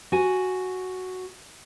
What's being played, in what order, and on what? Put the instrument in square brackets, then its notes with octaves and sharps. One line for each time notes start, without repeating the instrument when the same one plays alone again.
[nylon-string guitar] F#4 G#5